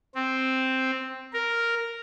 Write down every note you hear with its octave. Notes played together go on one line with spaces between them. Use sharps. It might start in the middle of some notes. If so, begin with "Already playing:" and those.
C4
A#4